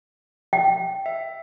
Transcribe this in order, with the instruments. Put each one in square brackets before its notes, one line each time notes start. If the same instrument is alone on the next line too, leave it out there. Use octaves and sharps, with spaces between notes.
[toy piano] G5
[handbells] E5